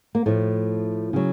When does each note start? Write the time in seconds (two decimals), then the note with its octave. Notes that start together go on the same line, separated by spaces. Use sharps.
0.15 A#3
0.26 A2 F3 A3
1.13 C#3 F#3